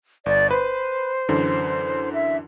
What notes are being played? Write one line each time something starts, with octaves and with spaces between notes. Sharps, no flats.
G1 D5
B4 C5
F#2 D3 E3
E5